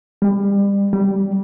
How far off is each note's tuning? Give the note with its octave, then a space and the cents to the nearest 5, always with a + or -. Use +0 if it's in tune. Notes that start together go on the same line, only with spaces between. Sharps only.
G3 +30
G3 -10